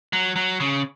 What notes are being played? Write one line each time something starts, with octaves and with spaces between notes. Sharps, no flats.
F#3
F#3
C#3